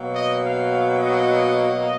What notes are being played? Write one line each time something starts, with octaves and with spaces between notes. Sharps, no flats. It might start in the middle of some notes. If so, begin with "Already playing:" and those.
Already playing: B2 F#3 A#3
D#5
F5
D#5